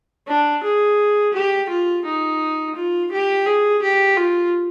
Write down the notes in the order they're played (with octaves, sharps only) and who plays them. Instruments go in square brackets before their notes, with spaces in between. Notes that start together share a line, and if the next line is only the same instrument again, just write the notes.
[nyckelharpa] D4
G#4
G4
F4
D#4
F4
G4
G#4
G4
F4